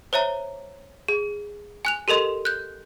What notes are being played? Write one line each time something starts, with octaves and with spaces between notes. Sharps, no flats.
C5 C#5 E5 A#5
G#4
G#5 F#6 F7
G4 A4 A#4 D#5 C6
F#6 G6